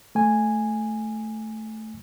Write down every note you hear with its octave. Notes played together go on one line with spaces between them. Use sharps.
A3 G#5